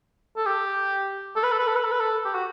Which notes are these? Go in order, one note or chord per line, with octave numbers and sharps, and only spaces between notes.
A4
G4
A4
B4
A4
B4
A4
B4
A4
B4
A4
G4
F#4